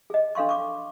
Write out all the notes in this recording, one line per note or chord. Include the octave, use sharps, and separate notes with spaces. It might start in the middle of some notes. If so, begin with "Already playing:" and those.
G#4 D#5
D4 A4 F5 C6 C#6
C#6 D6